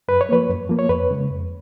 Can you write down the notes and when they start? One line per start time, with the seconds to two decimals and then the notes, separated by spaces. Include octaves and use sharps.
0.08 F#2 B4
0.21 C#5
0.29 F3 A#3 B4
0.50 F#2
0.69 F3 A#3
0.79 C#5
0.89 F2 B4
1.10 C#3 G#3
1.31 F2